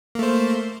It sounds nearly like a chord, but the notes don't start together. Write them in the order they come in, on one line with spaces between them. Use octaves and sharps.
A#3 A3 C5